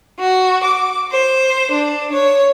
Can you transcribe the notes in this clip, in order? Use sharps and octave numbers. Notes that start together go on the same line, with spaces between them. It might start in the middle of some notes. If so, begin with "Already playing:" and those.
F#4
D6
C5
D4
C#5